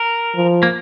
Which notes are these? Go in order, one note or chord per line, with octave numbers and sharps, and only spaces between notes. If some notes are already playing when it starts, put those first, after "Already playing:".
Already playing: A#4
F3
A#3